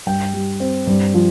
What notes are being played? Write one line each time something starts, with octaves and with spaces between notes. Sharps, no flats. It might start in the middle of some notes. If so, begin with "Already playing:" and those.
G2 G5
G3
C4
G2
F3